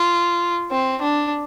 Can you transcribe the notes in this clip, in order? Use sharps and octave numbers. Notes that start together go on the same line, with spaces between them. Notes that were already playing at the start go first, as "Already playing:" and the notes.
Already playing: F4
C4
D4